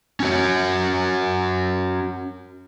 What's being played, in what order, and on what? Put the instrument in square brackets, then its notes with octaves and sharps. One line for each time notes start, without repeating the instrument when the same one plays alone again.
[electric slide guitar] C#4 F#4 C#5